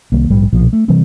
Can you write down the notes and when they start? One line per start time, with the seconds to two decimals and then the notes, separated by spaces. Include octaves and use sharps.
0.12 C2 D#3 G3 A#3
0.30 A#1 G#2 G3
0.53 B1 A#2 F3
0.73 A3
0.88 C3 E3 G3 C4